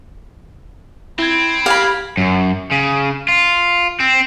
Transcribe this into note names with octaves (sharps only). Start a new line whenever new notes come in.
C4 E4 B5 G#6
G4 F5 B5 G#6
F#2
C#3
F4
C4